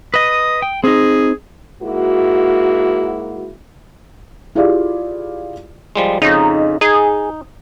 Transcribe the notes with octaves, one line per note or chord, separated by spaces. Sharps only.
B4 D#5 D#6
G5
C4 D#4 G#4
G#2 A#3 E4 F#4
E4 F4 G4 G#4 D5 F5
F3 G3 G#3
F2 C#3 D#4
D#4 G#4